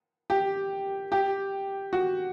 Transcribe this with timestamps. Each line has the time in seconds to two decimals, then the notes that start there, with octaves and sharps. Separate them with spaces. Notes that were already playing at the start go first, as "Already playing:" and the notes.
0.30 G4
1.12 G4
1.93 F#4